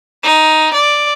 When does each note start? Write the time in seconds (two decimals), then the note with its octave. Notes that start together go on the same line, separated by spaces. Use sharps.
0.24 D#4
0.74 D5